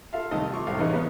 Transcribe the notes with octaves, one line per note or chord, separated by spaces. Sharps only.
F4 A4 E5 F5
C2 D#3 A3 D#5 A5
F4 C#6 D6
C2 A2 F5
E2 C#3 D#4 B4 D#5
B3 C#4